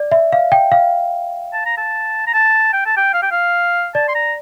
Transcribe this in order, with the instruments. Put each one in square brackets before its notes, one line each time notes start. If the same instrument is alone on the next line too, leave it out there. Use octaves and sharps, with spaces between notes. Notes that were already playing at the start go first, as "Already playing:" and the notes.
Already playing: [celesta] D5
E5
F5
G5
F5
[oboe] A5
A#5
A5
A#5
A5
G5
A5
G5
F5
G5
F5
[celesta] D5 [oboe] A5
[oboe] C6
A#5